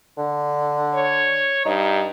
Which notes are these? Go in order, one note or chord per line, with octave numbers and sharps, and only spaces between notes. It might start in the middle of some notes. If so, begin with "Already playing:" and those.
D3
C#5
G2 D#4